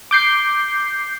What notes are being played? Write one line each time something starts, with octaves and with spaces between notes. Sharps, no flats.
D6 G6 C7